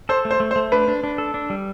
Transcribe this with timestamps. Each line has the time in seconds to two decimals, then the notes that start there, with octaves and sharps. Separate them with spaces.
0.09 A4 C5
0.25 A3
0.31 C5
0.40 A3
0.51 C5
0.56 A3
0.72 D4 B4
0.88 D4
1.03 D4
1.18 A4
1.34 D4
1.50 G3